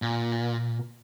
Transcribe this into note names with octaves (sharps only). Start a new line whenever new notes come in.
A#2